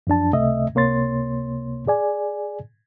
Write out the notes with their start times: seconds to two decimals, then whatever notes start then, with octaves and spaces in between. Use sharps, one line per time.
0.07 F#2 F3 D4 A5
0.33 C#2 C3 A3 D#5 E5
0.74 C#2 C3 A#3 C#5 C6 A6
1.87 G#4 D5 G#5